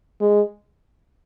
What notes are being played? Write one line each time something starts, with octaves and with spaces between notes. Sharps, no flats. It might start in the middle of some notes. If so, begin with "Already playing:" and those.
G#3